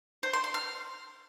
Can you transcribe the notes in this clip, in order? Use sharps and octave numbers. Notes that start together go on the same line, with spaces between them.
C5
C6
C6
F6